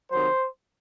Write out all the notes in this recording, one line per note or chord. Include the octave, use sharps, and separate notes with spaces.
C3 D#3 F#3 C5